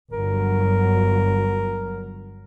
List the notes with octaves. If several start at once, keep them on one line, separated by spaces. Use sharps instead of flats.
G1 F#3 A#4